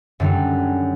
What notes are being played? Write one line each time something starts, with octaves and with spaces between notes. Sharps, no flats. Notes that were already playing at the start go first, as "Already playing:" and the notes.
F#2 D3 G3